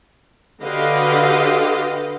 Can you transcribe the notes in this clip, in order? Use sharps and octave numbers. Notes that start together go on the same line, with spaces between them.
D3 F#4 G4 B4 D#5 F5